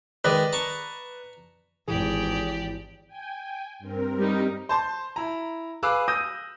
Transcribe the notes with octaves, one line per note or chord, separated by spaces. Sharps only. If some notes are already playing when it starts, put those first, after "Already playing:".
D#3 G#3 B4 D5 D#5
A5 A#5 C#6
G#1 G#2 E3 G4 G#4 D5
G5 G#5
G2 C4 A#4
G3 D#4
C5 A5 C6
E4 A#5
G#4 B4 F5 D6 E6 F#6
D#6 E6 G6 A#6 D#7